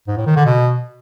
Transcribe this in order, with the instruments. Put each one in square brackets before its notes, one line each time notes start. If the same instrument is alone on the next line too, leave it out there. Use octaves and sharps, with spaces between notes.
[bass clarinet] G#2
A2
D#3
D3
B2